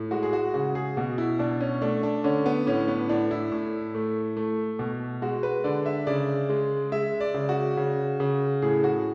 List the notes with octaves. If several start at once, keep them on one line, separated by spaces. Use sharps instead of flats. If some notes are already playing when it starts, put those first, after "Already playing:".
Already playing: A2
G#3 F#4
G#4
F#4
C#3 F#4
G#4
B2 F#4
E4
B2 D4
C#4
A3 D4
D4
D3 C#4
B3
A2 C#4
B3
A2 D4
E4
A2
A3
A3
B2
G#3 F#4
B4
D3 D5
E5
C#3 D5
G#3
G#3 E5
D5
C#3
F#4
C#3
C#3
A2 G#4
F#4